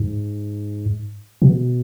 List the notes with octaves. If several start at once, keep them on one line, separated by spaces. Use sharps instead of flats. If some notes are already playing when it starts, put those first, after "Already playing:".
Already playing: G#2
B2